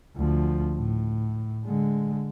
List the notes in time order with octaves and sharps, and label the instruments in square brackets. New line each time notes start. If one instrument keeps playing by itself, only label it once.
[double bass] D2 F3
A2
D3 G#3